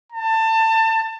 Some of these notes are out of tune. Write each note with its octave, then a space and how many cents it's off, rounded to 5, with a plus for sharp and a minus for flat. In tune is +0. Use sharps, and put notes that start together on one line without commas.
A5 +25